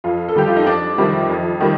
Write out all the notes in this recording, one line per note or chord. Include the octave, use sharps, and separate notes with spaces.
F2 F4
A4
D3 G3 G4
F4
D#4
F2 D4
C3 D#3 G3
F2
D#3 G3